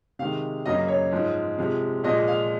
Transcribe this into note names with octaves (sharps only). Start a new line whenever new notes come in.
C3 D#3 G#3 F5
F#2 C#3 F#3 A#3 D#5
C#5
G#2 F3 G#3
C3 F3 G#3
A#2 F3 G#3 D#5
F5